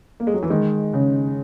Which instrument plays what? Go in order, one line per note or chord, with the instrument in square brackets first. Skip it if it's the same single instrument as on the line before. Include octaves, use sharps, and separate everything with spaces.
[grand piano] A#3
G#3
F#3
E3
[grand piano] D#3 [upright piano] G#3
[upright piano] C#3